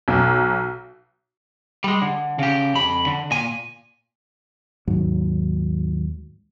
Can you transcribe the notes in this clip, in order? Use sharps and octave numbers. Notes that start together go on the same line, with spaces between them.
B1
G3 G#3
D3
C#3 G4
F2 B5
D3
A#2 G#5
D#2 G#2 F#3